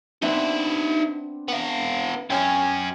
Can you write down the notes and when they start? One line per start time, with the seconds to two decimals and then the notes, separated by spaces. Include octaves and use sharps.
0.22 B3 C4 D4 D#4 E5
1.48 B3 F5
2.30 F#2 C#4 G5 G#5 F6